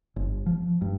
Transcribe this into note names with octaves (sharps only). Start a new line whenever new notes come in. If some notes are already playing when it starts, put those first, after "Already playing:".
G1
F3
G2